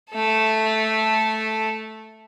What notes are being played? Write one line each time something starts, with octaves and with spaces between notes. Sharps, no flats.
A3 A4